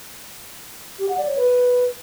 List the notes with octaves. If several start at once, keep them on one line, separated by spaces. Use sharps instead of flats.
G4
F#5
D5
C#5
B4